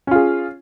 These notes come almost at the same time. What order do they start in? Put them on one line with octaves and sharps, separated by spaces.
C#4 F4 G#4